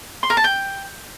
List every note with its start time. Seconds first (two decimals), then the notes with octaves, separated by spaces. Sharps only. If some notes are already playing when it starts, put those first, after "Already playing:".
0.23 C6
0.30 A#4
0.37 A5
0.44 G5